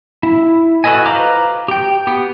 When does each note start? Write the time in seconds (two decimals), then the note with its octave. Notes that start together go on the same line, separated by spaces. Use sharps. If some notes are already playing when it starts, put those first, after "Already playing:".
0.23 E4
0.84 F#4 A4 B4 D#5 G#5
1.05 F4 B4 C5 A#5 D6
1.68 G4 G5
2.07 B3 G4